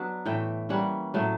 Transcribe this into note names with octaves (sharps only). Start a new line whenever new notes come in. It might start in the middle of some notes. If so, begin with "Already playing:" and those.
Already playing: F#3 B3 D4
A2 E3 A3 G5
E3 G3 A#3 C#4 F#5
A2 F#3 A3